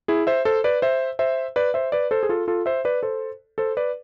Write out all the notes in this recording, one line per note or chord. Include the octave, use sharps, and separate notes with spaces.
E4 G#4
C5 E5
A4 C5
B4 D5
C5 E5
C5 E5
B4 D5
C5 E5
B4 D5
A4 C5
G#4
F4 A4
F4 A4
C5 E5
B4 D5
A4 C5
A4 C5
B4 D5